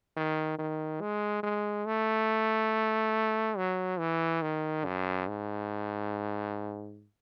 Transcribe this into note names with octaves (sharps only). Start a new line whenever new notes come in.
D#3
D#3
G#3
G#3
A3
F#3
E3
D#3
F#2
G#2